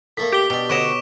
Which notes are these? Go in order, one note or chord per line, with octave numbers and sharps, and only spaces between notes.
A2 A3 A#3 B6
G4 D6 G7
B2 D4 G5
D2 B4 C#5 D#5 F#5 C#6 D7 E7